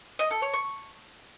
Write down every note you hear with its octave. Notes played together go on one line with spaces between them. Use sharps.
D#5
A4
C#5
C#6